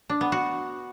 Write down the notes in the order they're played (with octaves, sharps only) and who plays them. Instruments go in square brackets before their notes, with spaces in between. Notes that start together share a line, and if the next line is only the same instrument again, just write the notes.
[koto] D4
B3
F#4